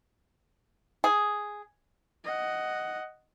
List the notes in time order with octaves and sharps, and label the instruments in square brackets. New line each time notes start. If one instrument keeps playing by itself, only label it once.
[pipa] G#4
[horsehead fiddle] D#5 F#5